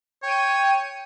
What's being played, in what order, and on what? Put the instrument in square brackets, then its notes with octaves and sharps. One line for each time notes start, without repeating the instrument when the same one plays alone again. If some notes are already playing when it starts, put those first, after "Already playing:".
[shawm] C#5 [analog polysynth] G5 D#7